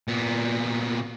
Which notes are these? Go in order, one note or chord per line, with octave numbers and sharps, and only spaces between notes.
A#2 B3